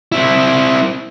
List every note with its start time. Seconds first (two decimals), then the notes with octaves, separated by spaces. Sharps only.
0.12 C4 E4